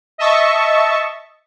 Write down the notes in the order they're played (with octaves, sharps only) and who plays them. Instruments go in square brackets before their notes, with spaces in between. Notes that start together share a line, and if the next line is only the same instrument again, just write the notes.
[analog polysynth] D#5 E5 A5 C#6